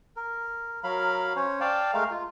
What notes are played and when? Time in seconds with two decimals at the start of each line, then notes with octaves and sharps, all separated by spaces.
0.16 A#4
0.83 F#3 A#4 F5 B5
1.36 C#4 C5 C#5
1.60 D5 F5 G5 A5
1.94 G#3 A3 A#4 F5
2.11 F4